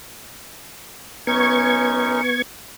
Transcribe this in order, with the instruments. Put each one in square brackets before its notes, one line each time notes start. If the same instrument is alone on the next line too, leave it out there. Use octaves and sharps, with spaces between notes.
[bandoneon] F#2 C#4 D#4 [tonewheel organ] B3 C#6 G#6